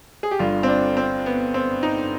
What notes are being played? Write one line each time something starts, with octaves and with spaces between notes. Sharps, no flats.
G#4
G4
G1 G2 D3 F4
C4
D4
C4
B3
C4
D#4